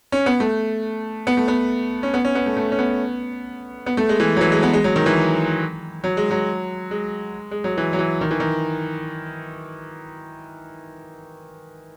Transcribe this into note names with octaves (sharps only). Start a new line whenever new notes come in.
C#4
B3
A3
B3
A3
B3
C#4
B3
C#4
B3
A3
A3
C#4
B3
B3
A3
G#3
E3
F#3
E3
G#3
B3
G#3
F#3
D#3
E3
F#3
G#3
F#3
G#3
G#3
F#3
E3
F#3
E3
D#3
E3
D#3